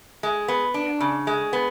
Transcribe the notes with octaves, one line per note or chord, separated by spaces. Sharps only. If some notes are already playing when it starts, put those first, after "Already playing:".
G#3
B3
D4
C#3
G#3
B3